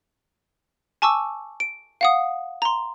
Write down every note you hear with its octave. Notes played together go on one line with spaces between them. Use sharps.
G#5 A5 C#6 D6 E6
D7
F5 F#5 D#6
A#5 C6